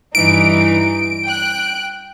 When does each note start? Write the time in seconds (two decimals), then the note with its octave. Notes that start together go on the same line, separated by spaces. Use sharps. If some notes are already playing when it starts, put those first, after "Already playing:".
0.15 G2 E3 D#4 D7
1.23 G5 F#6